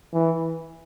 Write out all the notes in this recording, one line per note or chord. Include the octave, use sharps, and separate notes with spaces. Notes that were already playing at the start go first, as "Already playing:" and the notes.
E3